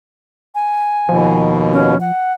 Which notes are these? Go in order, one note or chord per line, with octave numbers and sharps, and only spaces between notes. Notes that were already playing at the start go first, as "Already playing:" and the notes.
G#5
D#2 B2 F3
C#4
F#5